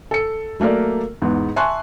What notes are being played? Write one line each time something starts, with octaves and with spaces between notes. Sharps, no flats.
A4 C#7
F#3 A3 A#3 A#4 D5
E2 G#2 B3
E5 G#5 A5 C6 C#6 F#6